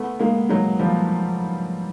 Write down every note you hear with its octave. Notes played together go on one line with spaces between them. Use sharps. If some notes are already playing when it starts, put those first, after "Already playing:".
Already playing: A3 B3
G#3 A#3
F#3 G#3
F3 G3